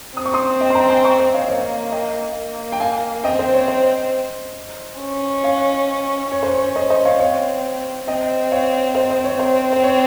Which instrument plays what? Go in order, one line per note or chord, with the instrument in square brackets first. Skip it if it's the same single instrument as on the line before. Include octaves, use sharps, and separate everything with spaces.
[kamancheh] C4 [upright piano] D#6
[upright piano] C#6
C6 D#6
D#5 G5
C6
G5 A#5
G#5 C6
A#5 C#6
C5 D#5
C#5 F5
[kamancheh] A#3 [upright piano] C#5 F5
[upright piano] D#5 G5
[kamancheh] A#3
[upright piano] G5
F5 G#5
[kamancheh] C4 [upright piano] D#5 G5
[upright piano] C5 D#5
C#5
C5 D#5
[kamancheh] C#4
[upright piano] C#5 F5
[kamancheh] C#4 [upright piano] C#5
[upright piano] C5
C#5
C5 D#5
C5 D#5
C#5 F5
[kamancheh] C4 [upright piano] C#5 F5
[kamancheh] C4 [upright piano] D#5 G5
[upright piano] C#5 F5
C5 D#5
C5 D#5
C#5
[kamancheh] C4 [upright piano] C5
[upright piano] C5
C#5